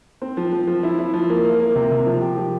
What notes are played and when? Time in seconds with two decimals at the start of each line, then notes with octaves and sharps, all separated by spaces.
0.22 C4
0.37 F3
0.52 F3
0.68 F3
0.83 E4
0.99 E4
1.14 F3
1.30 A#3
1.45 A#3
1.60 A#3
1.75 C3
1.91 C3
2.06 F3
2.22 G4
2.37 F3